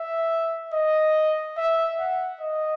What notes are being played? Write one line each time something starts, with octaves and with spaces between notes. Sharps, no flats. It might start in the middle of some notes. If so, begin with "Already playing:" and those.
Already playing: E5
D#5
E5
F#5
D#5